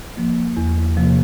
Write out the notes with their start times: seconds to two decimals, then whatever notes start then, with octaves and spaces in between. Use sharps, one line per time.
0.17 F3 A#3
0.57 E2
0.97 C3 F3 A#3